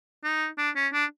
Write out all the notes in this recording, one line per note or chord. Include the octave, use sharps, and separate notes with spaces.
D#4
D4
C#4
D4